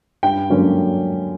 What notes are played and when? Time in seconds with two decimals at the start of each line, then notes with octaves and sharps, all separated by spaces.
0.23 G2 G5
0.50 D3 F#3 A#3 C#4